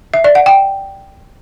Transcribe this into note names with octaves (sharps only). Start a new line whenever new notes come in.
E5
D5
F#5
G5